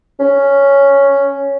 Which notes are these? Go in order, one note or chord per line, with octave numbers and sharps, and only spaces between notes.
C#4